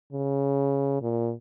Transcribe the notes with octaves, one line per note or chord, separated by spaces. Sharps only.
C#3
A#2